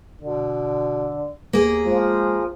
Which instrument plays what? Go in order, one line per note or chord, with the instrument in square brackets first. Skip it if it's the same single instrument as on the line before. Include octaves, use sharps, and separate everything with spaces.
[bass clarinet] B2 [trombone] D3
[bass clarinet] D#2 [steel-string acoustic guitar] A#3 G#4
[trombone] F3 [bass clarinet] G#3